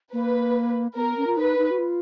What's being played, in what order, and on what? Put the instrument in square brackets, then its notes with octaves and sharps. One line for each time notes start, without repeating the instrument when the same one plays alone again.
[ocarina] A#3 [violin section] B4
[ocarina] B3 [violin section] A#4
[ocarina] C#4
F4
[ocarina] D#4 [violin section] B4
[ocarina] D#4
F#4
F4